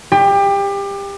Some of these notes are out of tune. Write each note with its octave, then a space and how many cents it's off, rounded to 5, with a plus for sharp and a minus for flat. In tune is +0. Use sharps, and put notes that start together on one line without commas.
G4 +25